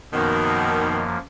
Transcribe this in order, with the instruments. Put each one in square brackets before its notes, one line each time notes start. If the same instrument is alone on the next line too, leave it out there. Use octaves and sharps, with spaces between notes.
[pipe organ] F#2 F3 A#3 [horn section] B2 D#3